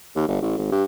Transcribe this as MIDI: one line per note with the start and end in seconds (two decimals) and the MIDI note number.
0.16 0.28 39
0.28 0.40 31
0.42 0.54 33
0.58 0.67 32
0.72 0.84 43